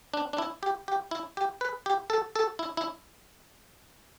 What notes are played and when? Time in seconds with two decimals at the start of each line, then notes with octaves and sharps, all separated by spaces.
0.14 D4
0.33 D4
0.38 E4
0.63 G4
0.88 G4
1.11 E4
1.37 G4
1.61 B4
1.86 G4
2.10 A4
2.36 A4
2.59 E4
2.77 E4